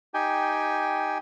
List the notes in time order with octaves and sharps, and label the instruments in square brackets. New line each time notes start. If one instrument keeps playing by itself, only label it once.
[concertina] D#4 G4 G5 G#5